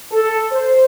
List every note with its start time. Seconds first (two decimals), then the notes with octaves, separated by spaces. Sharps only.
0.11 A4
0.51 C5